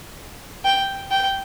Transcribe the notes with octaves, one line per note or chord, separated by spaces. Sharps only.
G5
G5